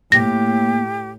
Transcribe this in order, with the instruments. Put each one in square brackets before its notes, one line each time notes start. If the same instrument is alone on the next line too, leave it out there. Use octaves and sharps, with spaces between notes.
[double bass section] A2 [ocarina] A#3 [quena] G4 [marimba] A#6